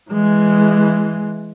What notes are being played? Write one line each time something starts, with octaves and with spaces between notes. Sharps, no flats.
E3 G#3